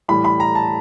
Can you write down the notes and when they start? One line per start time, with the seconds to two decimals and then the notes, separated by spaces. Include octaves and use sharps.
0.08 A2 E3 G3 B5
0.25 B5
0.40 A#5
0.55 A5